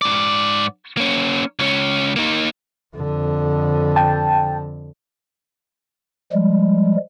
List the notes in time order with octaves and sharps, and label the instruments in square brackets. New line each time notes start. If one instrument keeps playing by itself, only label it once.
[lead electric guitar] G#2 D5
A#3 C#4
C#2 C#4
A#3 D#4
[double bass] F2 D3
[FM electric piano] G5 A5
[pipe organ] F3 G3 G#3